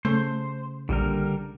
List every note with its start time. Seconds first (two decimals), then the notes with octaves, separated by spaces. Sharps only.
0.05 C#3 A3 C5
0.89 A#1 D3 G3 A#4